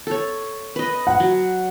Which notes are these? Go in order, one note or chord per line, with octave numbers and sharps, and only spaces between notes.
A4 C#5
B4 D#5
F#5
F#3